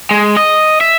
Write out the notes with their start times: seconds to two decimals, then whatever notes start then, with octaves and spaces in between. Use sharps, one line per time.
0.11 G#3
0.37 D#5
0.81 E5